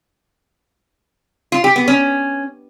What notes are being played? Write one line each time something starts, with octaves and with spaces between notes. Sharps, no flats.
F4
G4
B3
C#4